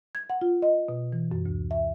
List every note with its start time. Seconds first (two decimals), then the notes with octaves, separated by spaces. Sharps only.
0.15 G#6
0.30 F#5
0.41 F4
0.62 D#5
0.89 B2
1.12 E3
1.32 F#2
1.46 D2
1.71 E5